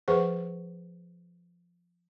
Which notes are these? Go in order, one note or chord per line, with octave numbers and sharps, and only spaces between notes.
F3 G#4 B4 C5 F#5 C#6